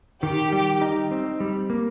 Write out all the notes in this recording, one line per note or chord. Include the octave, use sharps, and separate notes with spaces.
D#3 G4
G3
D#4
C4
G3
A#3